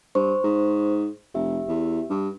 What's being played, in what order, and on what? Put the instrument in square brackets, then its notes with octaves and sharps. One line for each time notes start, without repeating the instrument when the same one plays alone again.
[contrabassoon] G2 [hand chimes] C5 C#6
[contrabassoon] G#2
[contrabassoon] F1 [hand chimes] G4 E5
[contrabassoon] E2
G2